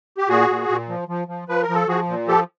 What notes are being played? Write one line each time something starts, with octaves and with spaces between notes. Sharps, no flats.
G4
A#2 F#4 G#4
A#2
A#2
F3
F3
F3
F3 B4
A#4
F3
A4
F3 F#4 G#4
A#2
F3 G4 A4